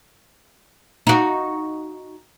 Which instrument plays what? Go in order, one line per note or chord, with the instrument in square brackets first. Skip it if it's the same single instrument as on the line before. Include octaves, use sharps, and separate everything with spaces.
[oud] D#4 F#4